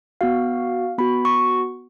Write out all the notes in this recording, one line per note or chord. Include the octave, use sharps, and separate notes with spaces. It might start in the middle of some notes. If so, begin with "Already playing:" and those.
B3 F#4 F5
B3 F#4 B5
C#6